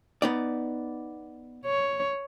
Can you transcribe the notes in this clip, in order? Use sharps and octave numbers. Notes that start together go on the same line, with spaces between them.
B3 D#4 D5
C#5